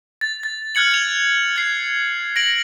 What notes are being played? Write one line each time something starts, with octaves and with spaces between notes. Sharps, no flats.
A6
A6
F6 F#6 G#6 C#7 F#7
G#6 F7
G#6 C7
A#6 D7 F#7